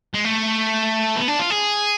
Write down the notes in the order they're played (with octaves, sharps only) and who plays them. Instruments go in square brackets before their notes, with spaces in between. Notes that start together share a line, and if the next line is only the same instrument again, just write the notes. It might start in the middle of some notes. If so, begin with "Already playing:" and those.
[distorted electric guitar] G#3
A3
B3
D4
F4
G#4